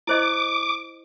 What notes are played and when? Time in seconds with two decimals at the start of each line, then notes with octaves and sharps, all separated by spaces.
0.07 E4 C5 D#5 D6